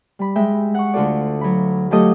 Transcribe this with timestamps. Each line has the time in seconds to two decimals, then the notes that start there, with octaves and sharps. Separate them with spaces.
0.19 G3 B5
0.36 G#3 E5 G5
0.74 F#5 C#6
0.93 D2 D3 F4 F#4 A4 D5
1.41 F#3 B5
1.91 F#3 A3 F4 G4 A4 D#5